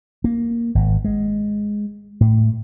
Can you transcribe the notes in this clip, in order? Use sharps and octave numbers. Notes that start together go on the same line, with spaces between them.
A#3
G#1
G#3
A2